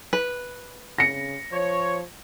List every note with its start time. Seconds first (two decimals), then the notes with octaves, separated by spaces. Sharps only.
0.13 B4
0.98 C#3 A#6 C#7
1.52 F3 C#5